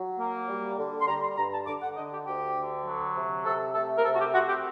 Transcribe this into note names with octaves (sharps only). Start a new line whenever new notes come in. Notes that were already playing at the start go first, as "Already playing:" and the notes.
Already playing: F#3
A#3
G3
D3
C6
G3 A#5
C6
G2 A#5
A5
D3 D6
F#5
D3 D#5
G4
D2 G4
D3
F#3
C3
C3 A4
A3 A4
A#4
C3 A4
F#4
G4
C4 F#4
G4